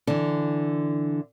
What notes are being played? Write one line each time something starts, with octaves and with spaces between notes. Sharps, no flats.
D3 E3